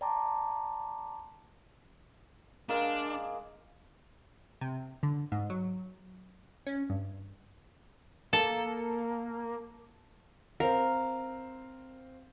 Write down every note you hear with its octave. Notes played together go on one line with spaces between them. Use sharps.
D5 G5 A5 A#5 C6 D6
G#3 A#3 D4
C3
D3
G#2
F#3
C#4
G2
A#3 A4
C4 A#4 F5